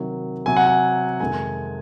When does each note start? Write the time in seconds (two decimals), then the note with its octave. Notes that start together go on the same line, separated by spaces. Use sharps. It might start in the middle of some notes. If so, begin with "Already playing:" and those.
Already playing: C3 D#3 F#3
0.46 C3 F#3 G#5
0.57 F#5
0.66 G#5
1.20 F2 C3 D#3 G#3 G#5